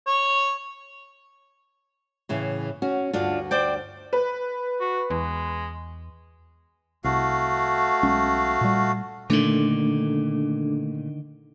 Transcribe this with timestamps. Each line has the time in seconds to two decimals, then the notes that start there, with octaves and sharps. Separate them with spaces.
0.06 C#5
2.29 A2 C#3 E3
2.82 C#4 F#4
3.13 D2 G2 D4 F4 F#4
3.51 C5 D5 G5
4.13 B4
4.80 F#4
5.10 E2 G#3
7.04 C2 A3 F#4 F5
8.03 B1 G#3 C#4
8.61 A#2 G3
9.30 A#2 D3 D#3 A3 D4 A4